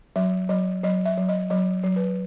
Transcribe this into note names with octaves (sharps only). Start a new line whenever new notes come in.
F#3 E5
F#3 D#5
F#3 D#5
E5
F#3
D#5
F#3 D#5
F#3
B4